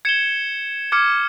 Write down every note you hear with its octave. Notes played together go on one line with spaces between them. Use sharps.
G#6 C#7 E7 G7
D6 F6 G#6 C#7